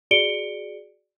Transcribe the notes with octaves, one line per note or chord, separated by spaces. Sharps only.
F#4 G#4 D5 C#7 D7 G7